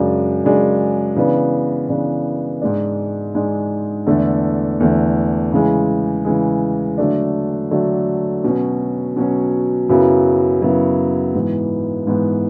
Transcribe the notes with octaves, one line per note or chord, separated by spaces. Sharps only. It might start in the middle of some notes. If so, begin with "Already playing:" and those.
Already playing: F#2 C#3 G#3 D4
F#2 C#3 G#3 D4
C#3 E3 B3 D4
C#3 E3 B3 D4
G#2 G#3 D4
G#2 G#3 D4
E2 D3 A3
E2 D3 A3
C#3 E3 G#3
C#3 E3 G#3
D3 F#3 A3 D4
D3 F#3 A3 D4
B2 F#3 C#4
B2 F#3 C#4
F#2 C#3 F#3 B3 E4
F#2 C#3 F#3 B3 E4
G#2 E3 B3
G#2 E3 B3